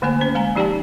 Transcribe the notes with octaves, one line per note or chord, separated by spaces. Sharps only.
D3 A3 A#3 C5 G#5
C#4 C5
G#3 G#5 A#5
F3 D#4 G4 D5 G5 A5